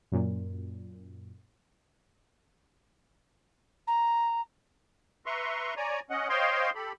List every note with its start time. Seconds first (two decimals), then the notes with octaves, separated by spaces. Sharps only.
0.12 F#2 A#2
3.87 A#5
5.26 B4 E5 A#5 C6 C#6
5.77 C#5 D5 G#5 A#5
6.10 C#4 D#5 F#5
6.29 C5 C#5 D#5 F5 G5 C6
6.75 G4 A4 B5